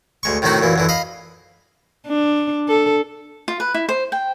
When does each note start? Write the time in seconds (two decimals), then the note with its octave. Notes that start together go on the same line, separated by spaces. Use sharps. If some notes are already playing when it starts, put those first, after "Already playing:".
0.23 D2 G#3 C#6
0.42 A2 C3 D#3 F#3 D#4 F#4
0.62 F#2 A#2 E3
0.76 F#2 D3 E3
0.89 D#5 F5 B5
2.07 D4
2.68 A4
3.48 F4
3.60 B4
3.74 E4
3.89 C5
4.12 G5